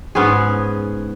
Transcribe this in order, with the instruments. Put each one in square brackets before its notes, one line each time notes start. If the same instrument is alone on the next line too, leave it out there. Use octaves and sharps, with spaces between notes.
[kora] G#2 B3 C#4 G#4